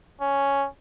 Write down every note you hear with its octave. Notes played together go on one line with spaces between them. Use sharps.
C#4